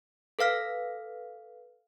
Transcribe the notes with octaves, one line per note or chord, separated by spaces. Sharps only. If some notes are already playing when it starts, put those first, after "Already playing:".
A4 B4 F5 F6 B6